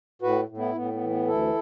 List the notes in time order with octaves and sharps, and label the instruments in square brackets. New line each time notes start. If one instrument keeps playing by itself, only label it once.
[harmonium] A2 F#4 B4
A2
B3 E4
A2 B3
B3
E3
B3
D2 E4 A4